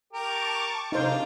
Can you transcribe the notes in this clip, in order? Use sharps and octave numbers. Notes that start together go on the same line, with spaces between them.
G4 A#4 A5 C#6 D6
C3 D4 D#4 F4 C5 D6